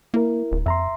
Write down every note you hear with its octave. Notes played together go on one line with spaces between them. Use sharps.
A#3 E4 A#4
D#1
F2 E5 A#5 C6